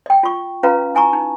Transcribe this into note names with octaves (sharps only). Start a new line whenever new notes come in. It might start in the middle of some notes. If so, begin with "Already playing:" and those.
D#5 G5
F4 C#6
C#4 F4 B4 F5 A#5
E4 G#5 A#5 C#6
D#4